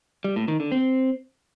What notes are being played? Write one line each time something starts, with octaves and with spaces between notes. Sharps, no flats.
G3
A2
D#3
D3
C4